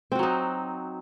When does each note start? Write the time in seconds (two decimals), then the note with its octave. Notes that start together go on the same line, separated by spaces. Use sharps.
0.12 C4
0.15 F#4
0.19 F#3
0.23 D#4